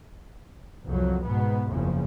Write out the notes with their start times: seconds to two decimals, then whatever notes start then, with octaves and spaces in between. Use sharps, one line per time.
0.86 C2 F2 F#3
1.26 G#2 B2 B3
1.70 F#1 E2 C#3 F3